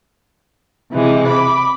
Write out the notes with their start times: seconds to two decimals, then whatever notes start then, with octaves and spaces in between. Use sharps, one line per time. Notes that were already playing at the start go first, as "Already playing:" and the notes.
0.93 C3 E3 G#3
1.28 B5 D6